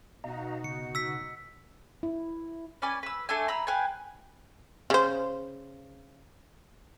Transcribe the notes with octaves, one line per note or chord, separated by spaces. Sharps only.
B2 D#4 F#4 D#5 F5 A#5
C#3 C#7
E6 B6
E4
C#4 B4 D5 G#5
B4 E6
A3 D4 E5 G#5
A#5 B5 E6
B4 F5 G5 G#5
C#3 C5